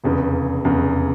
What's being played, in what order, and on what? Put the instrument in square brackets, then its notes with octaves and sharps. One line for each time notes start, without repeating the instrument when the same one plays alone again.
[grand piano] F1 E2 C#3
F1 E2 C#3